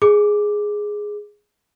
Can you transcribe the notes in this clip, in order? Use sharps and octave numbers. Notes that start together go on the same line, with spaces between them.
G#4 D6